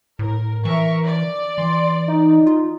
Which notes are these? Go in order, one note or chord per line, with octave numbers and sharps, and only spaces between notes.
A2 A#4
E3 A#4 E5 C#6
D5
E3 C6
D#4
F4